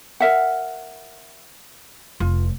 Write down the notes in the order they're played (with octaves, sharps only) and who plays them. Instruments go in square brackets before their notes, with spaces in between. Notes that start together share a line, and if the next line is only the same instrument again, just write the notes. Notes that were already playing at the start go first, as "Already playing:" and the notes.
[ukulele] A#4 E5 F#5
[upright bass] F1 [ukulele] F4